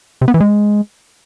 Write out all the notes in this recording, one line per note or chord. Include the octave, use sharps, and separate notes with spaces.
C3
B3
E3
G#3